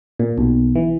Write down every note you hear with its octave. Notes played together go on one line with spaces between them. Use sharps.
A#2
B1
E3